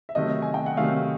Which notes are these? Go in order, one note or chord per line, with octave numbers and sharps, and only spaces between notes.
E5
C3 D#3 F#3 A3 D#5
G#5
G5
F#5
C3 D#3 F#3 A3 F5